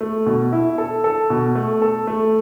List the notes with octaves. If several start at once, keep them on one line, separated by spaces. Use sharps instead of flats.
A3
B2
E4
A4
A4
B2
A3
A4
A3